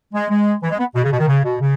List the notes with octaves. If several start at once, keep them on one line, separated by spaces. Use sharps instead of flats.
G#3
G#3
E3
G#3
B3
B2
C#3
B2
D#3
C#3
B2
C#3